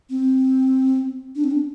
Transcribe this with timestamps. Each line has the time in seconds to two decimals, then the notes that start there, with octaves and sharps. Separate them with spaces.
0.10 C4
1.35 D4
1.44 C4
1.51 D4